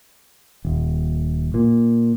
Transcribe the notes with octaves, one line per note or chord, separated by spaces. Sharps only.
D#1
A#2